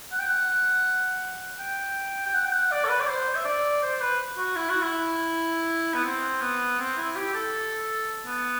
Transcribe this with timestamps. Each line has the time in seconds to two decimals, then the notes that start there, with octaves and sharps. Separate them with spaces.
0.12 F#5
0.19 G5
0.26 F#5
1.59 G5
2.26 G5
2.34 F#5
2.45 G5
2.52 F#5
2.71 D5
2.84 A4
2.89 B4
3.00 D5
3.07 C5
3.35 E5
3.45 D5
3.82 C5
4.00 B4
4.37 F#4
4.56 E4
4.69 F#4
4.82 E4
5.94 B3
6.04 C4
6.41 B3
6.79 C4
6.97 E4
7.15 G4
7.34 A4
8.26 B3